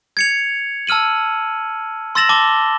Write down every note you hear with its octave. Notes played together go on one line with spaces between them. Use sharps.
G#6 C#7 F7
A5 E6 F6 D#7 F#7
C6 E6 A6 A#6 E7 F#7
A5 D6 G7